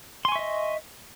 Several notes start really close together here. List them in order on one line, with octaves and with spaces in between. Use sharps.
C6 G#5 C#6 E5 D#5